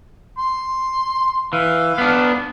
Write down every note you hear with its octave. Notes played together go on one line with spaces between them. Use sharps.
C6
E3 F5
B3 D4